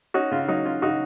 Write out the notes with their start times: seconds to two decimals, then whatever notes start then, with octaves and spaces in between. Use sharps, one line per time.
0.14 C#4 D#4 F#4
0.31 C#3 F4
0.48 F#3 D#4
0.65 C#4 F4
0.82 C#3 D#4 F#4